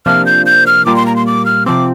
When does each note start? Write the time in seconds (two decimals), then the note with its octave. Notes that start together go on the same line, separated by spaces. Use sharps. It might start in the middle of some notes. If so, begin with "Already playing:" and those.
0.06 C3 F3 A#3 D4 F6
0.26 G6
0.46 G6
0.67 F6
0.86 A#2 G3 A#3 F4 D6
0.96 C6
1.06 A#5
1.16 C6
1.27 D6
1.46 F6
1.66 C3 F3 C4 D6